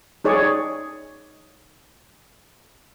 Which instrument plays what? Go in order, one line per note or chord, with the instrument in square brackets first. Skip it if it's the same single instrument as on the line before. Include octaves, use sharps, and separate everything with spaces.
[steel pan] D#4 G#4 C#5 D5